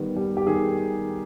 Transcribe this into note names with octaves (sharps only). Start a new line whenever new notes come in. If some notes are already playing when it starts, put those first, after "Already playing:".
Already playing: D#3 G3 B3
G3
G4
D#3 G#4